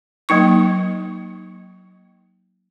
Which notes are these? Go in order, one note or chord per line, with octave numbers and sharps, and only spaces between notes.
F#3 A#3 D#4 C#6